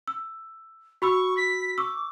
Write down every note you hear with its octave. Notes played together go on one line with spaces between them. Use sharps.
E6
F#4 B5 C#6 E6
B6
C#6 D6 E6